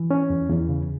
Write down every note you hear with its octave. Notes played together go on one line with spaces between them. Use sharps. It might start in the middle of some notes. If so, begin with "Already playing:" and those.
Already playing: E3
C#4
E2
E2
C#3